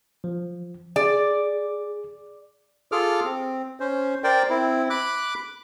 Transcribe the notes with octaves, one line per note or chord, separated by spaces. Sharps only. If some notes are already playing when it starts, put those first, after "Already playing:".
F3
G#4 D5
F4 G#4 A4 D6 F6
C4
C#4 C5
A#4 C5 D5 G5
C4 E4
B5 D6 F#6